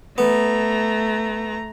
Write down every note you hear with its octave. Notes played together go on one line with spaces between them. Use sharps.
A3 B3 A#5